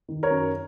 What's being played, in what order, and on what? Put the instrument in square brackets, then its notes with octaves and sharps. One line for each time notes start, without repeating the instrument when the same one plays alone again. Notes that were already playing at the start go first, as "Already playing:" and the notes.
[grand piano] D#3
A#4 C#5
F#2